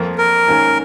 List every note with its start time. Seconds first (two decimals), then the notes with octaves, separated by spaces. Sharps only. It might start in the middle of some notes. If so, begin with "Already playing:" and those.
Already playing: F2 F3 A#3
0.18 A#4
0.47 G#2 D#3 A#3 C#4